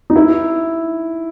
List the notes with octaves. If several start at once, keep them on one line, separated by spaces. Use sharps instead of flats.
D#4
E4